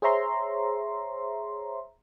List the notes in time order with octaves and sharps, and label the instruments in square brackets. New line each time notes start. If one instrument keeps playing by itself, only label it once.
[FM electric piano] G#4 C5 C#5 E5 A#5 C6